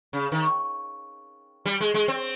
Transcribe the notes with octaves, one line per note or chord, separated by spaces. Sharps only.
C#3
D#3
G3
G#3
G#3
C4